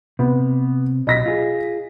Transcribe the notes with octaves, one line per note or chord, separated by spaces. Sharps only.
C3 B3
B1 D#5 A#6 B6
F4 G#4